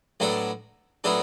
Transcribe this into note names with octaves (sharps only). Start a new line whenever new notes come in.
A2 F#3 B3 D4 A4
A2 F#3 B3 D4 A4